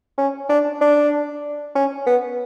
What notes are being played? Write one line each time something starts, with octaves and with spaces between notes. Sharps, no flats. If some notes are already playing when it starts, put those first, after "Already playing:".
C#4
D4
D4
C#4
B3